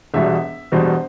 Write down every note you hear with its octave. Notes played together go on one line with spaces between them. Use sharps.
E1 E2 B2 G3 E5
E1 E2 B2 G3 C5